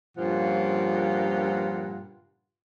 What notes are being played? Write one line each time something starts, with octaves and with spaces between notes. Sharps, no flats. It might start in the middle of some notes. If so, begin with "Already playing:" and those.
G2 A#2 C#3 F3 F4 F#5